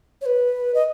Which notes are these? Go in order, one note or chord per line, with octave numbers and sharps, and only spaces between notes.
C#5
B4
D#5